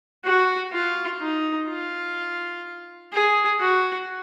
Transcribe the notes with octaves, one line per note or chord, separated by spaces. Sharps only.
F#4
F4
D#4
F4
G#4
F#4